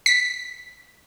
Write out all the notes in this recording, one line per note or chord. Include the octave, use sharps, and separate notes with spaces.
B6